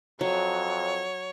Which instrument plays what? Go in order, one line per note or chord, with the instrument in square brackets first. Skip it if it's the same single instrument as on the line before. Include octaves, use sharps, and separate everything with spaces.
[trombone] F2 [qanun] F#3 [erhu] C#5